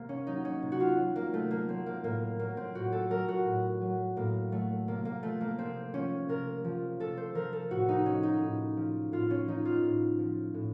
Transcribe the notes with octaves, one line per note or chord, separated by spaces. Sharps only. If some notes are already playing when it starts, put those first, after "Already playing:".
Already playing: C3 A#3
C#4
F#3 D#4
C#4
C3
F#4
F4
F#3
A#3
C3 A3
A#3
F#3 C4
A#3
A2 A#3
F#3 A#3
C4
A2 F#4
A4
F#3 A#4
F#4
A2
F#3
A2 A#3
F#3 A3
C3 A#3
A#3
F3 A3
A#3
C3 C4
F3 C#4
C3 A#4
F3
C3 A4
C5
F3 A#4
A4
A2 F#4
D#4
F3 C#4
D#4
A2
F3
A2 F4
C#4
F3 D#4
F4
A2
F3
A2